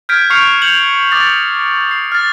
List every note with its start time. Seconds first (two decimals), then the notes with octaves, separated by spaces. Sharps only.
0.09 F6 G6 G#6 B6 D7
0.30 C#6 F6 G6 C7 C#7 F7
0.62 G6 C#7 F7 F#7
1.12 D6 D#6 A6
1.91 C7
2.12 F6 A6